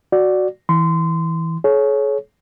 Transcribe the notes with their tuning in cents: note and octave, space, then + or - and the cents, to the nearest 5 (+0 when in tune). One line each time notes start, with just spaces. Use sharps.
F#4 +0 D5 +0
E3 -15 C6 -25
G#4 +45 C#5 +0